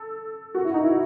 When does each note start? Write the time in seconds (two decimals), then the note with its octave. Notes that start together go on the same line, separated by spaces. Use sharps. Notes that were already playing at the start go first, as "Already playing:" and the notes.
Already playing: A4
0.55 F#4
0.65 E4
0.74 D#4
0.84 E4